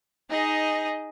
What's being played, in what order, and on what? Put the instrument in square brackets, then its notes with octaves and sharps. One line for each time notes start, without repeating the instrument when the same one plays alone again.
[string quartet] D#4 G#4 D#5